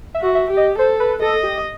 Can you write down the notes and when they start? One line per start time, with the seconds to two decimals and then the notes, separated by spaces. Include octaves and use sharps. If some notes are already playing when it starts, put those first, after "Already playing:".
0.15 E5
0.21 F#4
0.35 E5
0.50 G4
0.57 D#5
0.78 A4 C5
1.00 B4
1.22 A4 D#5
1.43 G4